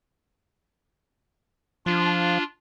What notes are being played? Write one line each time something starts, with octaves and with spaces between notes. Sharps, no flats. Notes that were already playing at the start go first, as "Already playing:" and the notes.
F3 D4 F4